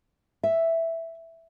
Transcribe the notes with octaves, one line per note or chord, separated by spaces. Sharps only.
E5